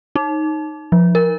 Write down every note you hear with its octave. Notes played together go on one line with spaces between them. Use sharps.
D#4
F3
A#4